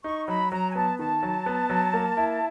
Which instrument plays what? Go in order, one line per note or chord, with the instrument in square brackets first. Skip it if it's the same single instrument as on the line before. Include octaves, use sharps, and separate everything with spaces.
[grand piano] D#4 [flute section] C#6
[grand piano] F#3 [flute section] B5
[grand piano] F#3 [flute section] A#5
[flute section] G#5
[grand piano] B3 [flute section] A5
[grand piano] D#3 [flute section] A5
[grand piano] F#3
B3
F#3
A#3
E4